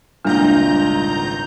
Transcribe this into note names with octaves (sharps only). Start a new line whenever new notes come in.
G#1 C#2 A#2 G3 D4 E4 A#5 G6